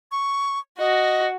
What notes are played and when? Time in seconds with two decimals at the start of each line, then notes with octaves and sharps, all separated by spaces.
0.12 C#6
0.79 F#4 D#5